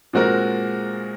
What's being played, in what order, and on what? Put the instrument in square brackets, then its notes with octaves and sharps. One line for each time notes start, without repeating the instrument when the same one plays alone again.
[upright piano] A#2 G#3 C4 F#4 A#4